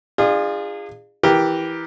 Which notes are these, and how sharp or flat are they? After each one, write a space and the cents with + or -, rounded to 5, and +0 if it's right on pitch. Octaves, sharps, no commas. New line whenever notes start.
D4 +45 F4 +0 G#4 -25
E3 +0 G4 +0 A#4 +10